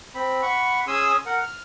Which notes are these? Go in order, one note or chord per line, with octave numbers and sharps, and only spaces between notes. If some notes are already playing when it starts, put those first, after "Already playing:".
C4 B5
F#5 B5 C#6
C#4 G#4 G#5 C6 D#6 E6
A#4 F#5
F6